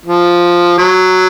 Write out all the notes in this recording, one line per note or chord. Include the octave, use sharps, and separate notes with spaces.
F3
F#3